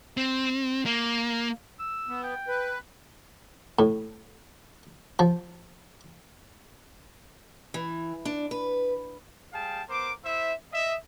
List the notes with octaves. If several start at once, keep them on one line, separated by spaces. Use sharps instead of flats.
C4
A#3
E6
B3
G5
B4
A2
F3
E3
D4
B4
G3 G#4 F5 G5 A5
B3 A#4 C5 D6
E4 C5 E5
D#5 E5